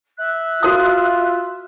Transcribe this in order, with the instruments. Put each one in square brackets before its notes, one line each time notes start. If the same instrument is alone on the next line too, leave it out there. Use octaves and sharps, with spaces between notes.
[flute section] E5 F#6
[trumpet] F4 [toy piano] F#4 A#4 D#6